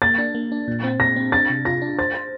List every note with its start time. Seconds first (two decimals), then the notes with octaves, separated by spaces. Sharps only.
0.02 A#3 A6
0.18 D4
0.35 A#3
0.52 D4
0.68 A#2
0.84 C4
1.00 A#2 A#6
1.16 C4
1.32 D4 A6
1.50 C3
1.65 F4 A#6
1.82 D4
1.98 C5 A6
2.14 C5